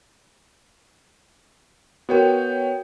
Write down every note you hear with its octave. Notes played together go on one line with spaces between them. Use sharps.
B3 F#4 A#4 C#5 G5